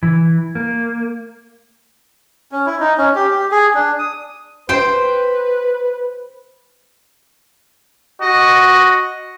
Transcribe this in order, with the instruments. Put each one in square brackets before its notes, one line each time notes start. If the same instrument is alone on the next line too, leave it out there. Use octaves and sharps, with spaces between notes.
[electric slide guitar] E3
A#3
[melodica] C#4
E4
D#4
C#4
G4
G4
G#4
D4
D#6
[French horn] B4 [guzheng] C5 G5
[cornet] F#4 [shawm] D#5